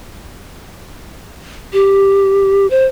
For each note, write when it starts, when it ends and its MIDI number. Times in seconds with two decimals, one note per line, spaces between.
1.73 2.67 67
2.70 2.86 72